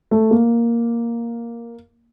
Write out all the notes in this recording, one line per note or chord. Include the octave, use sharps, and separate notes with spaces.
A3
A#3